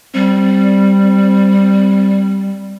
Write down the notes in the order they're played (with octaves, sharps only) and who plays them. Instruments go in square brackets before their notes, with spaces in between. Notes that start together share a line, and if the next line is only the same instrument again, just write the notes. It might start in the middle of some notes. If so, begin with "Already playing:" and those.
[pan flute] G3 [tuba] C4